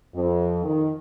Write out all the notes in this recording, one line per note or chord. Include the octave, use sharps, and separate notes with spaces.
F2
D#3